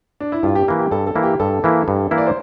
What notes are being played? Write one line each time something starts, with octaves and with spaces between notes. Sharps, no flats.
D4
E4
G2 F4
G4
E3 A#3 E4
G4
G2 A4
A4
E3 A#3 E4
G4
G2 A4
E3 A#3 E4
G2
E3 A#3 E4
D5
C5